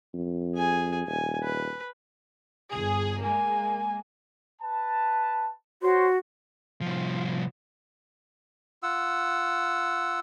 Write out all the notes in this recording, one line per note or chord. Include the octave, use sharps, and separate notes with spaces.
F2
G#4 G#5
D#1 G#5
B4
G1 G#4
G#3 A#3 G#5
B4 A5
F#4 C5 C#5 C6
C2 F3
F4 F#5 E6